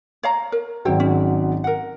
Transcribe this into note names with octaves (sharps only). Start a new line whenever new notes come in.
C#5 F5 A#5
A#4
G#1 G#2 F#3 E4 C5 G5
C#4
A#4 F#5